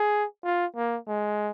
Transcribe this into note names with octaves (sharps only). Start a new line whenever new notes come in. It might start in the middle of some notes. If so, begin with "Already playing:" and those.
Already playing: G#4
F4
A#3
G#3